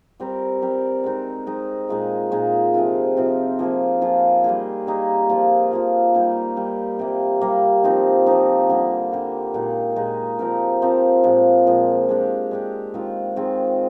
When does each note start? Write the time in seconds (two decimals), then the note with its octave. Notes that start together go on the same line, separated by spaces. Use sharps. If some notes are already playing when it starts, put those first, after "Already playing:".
0.20 G3 C4 G4 A#4
0.62 G3 C4 G4 A#4
1.04 G#3 C4 D#4
1.47 G#3 C4 D#4
1.89 A#2 G#3 D#4
2.32 A#2 G#3 D#4
2.74 C3 F3 C4 F4
3.17 C3 F3 C4 F4
3.59 F3 A#3 F4 G#4
4.01 F3 A#3 F4 G#4
4.44 G3 A#3 D#4 G#4
4.87 G3 A#3 D#4 G#4
5.29 F3 A#3 F4
5.71 F3 A#3 F4
6.14 G3 A#3 D#4 G4
6.56 G3 A#3 D#4 G4
6.99 C3 G3 A#3
7.41 C3 G3 A#3
7.84 F3 C4 D#4
8.27 F3 C4 D#4
8.69 D3 G3 A#3
9.12 D3 G3 A#3
9.54 A#2 G#3 D#4
9.96 A#2 G#3 D#4
10.39 F3 C4 G4 A#4
10.82 F3 C4 G4 A#4
11.24 A#2 F3 G#3
11.67 A#2 F3 G#3
12.09 G#3 D4 G4
12.51 G#3 D4 G4
12.94 D#3 G#3 C4 F4
13.36 D#3 G#3 C4 F4